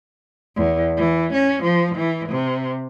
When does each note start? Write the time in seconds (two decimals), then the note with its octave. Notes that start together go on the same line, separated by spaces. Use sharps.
0.56 E2
0.98 E3
1.33 C#4
1.63 F3
1.96 E3
2.29 C3